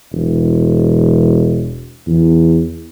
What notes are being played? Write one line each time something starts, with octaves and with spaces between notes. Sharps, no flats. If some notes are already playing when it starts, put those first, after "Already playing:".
E1
E2